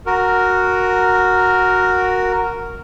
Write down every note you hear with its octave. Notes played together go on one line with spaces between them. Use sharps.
F#4 A#4